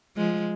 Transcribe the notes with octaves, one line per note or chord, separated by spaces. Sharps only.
F3 G#3